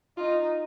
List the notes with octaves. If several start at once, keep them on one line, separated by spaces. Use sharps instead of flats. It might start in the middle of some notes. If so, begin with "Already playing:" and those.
D#4 F4